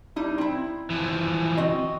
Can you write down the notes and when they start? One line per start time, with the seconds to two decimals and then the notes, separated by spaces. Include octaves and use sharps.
0.16 G3 D#4 E4
0.38 C4 E4
0.90 E3 F3
1.57 C4 F#4 D#5